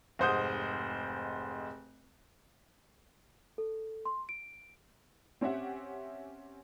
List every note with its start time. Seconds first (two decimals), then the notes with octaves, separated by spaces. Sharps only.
0.19 F1 G#2 C5 F#5 D#6 G6
3.58 A4
4.05 C6
4.29 D7
5.41 C4 C#4 G4 E5 F#5